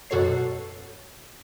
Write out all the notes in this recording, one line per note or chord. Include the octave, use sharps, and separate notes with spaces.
F#2 B2 F#4 A4 C#5 C7